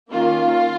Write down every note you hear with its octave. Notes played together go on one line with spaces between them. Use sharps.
D#3 A#3 C#4 F4